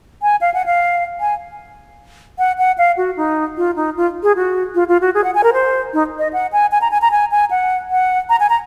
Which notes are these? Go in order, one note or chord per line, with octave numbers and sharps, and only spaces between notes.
G#5
F5
F#5
F5
G#5
F#5
F#5
F5
F#4
D#4
F4
D#4
F4
G#4
F#4
F4
F4
F#4
G#4
F#5
G#5
A#4
C5
D#4
D#5
F#5
G#5
G#5
A#5
G#5
A#5
G#5
G#5
F#5
F#5
A#5
G#5
A#5